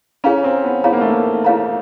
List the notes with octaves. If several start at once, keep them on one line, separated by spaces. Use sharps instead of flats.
C#4 E4 G#4 C#5 F5 A#5
C4
B3
B3 E4 G#4 C#5 F5 A#5
A#3
A3
A#3
E4 G#4 C#5 F5 A#5